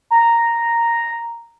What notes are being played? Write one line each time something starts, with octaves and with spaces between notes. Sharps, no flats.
A#5